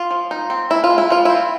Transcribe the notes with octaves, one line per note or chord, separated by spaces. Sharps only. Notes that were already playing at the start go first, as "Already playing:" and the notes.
Already playing: F4
F3
D#4
C4
G#3 E4
F4
G#3
E4
F3 F4
C4 E4